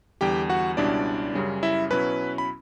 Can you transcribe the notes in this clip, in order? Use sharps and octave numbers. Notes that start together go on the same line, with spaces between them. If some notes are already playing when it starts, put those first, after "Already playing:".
E2 D3 G3 G4 G5
F#4 F#5
C#2 B2 G3 C#4 D4 E4 D5
F#2 C#3 G3 C#4
E4 E5
B2 F#3 C#4 E4 B4 B5
B5